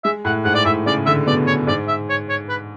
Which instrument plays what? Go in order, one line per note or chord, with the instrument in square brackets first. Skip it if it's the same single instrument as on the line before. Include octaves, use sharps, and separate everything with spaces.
[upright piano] G#3 [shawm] E5
[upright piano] A2 [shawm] F#5
[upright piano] G#2 [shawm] F#5
[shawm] D5
[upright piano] A2 [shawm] E5
[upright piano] C#3 [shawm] D5
[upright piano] D3 [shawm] E5
[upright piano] B2 [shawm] D5
[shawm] C#5
[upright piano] G#2 [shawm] D5
[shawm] E5
C#5
C#5
B4